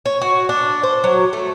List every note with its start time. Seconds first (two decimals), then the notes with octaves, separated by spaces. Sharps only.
0.06 C#5
0.22 F#4
0.49 D4
0.83 C5
1.04 F#3
1.33 A3